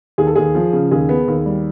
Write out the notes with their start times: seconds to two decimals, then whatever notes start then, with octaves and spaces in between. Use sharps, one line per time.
0.18 D#2 G#4
0.27 A4
0.36 D#2 G#4
0.55 F3
0.73 C#3
0.91 D#2 G#4
1.09 B3
1.28 D#2
1.46 G3